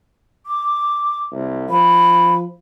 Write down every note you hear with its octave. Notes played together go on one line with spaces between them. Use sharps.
D6
C2
F3 B5